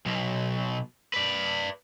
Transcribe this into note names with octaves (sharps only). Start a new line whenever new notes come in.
B1 B2
B4 D5